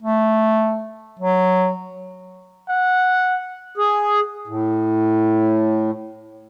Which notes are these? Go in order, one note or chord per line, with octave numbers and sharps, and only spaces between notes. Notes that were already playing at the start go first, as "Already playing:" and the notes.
A3
F#3
F#5
G#4
A2